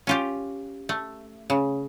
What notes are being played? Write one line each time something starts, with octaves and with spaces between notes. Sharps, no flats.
C#4 F4 G4
A3
C#3